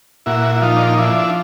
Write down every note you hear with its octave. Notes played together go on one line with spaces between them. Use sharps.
A#2 E4 F#4
E4
F3 D#4 F4
D4
D#4
F3 D4 E4